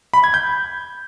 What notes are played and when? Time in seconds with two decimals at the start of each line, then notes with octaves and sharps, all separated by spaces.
0.14 B5
0.24 G#6
0.34 G6